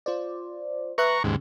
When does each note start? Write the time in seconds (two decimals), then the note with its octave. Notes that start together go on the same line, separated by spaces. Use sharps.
0.06 F4 C5 D5
0.98 B4 E5 A#5 C#6 F#6
1.24 D#2 G#2 C#3